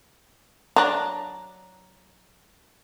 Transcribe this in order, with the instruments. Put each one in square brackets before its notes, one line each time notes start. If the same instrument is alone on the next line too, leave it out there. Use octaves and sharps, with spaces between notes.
[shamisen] F#3 D4 [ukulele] A#5